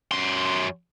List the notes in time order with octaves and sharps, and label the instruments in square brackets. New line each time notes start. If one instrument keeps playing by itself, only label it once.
[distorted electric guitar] F#2 C6